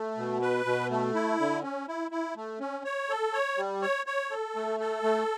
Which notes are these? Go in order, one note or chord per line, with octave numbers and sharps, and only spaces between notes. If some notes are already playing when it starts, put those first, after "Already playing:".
Already playing: A3
B2
B4
B2
A3
E4
D3
C#4
E4
E4
A3
C#4
C#5
A4
C#5
G3
C#5
C#5
A4
A3
A4
A3